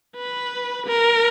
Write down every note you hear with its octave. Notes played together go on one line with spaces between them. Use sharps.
B4
A#4